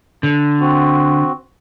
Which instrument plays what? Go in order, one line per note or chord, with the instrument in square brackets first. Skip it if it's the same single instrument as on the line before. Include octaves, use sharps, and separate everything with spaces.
[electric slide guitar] D3
[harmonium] C4 F#4